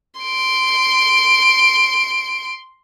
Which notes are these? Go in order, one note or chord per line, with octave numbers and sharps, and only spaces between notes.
C6 D7